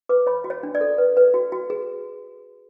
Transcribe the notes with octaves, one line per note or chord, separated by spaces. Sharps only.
B4 D6
C#5 B5
F#4
C#5
D4
D5
A4
B4
B4
F#4
F#4
G#4